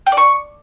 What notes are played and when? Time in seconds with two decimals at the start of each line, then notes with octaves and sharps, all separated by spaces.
0.06 G5
0.12 D5
0.17 C#6